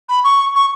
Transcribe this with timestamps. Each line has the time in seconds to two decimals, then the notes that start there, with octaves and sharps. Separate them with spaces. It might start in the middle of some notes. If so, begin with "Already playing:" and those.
0.09 B5
0.24 C#6
0.55 C#6